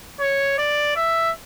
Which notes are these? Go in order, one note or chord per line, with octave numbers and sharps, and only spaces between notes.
C#5
D5
E5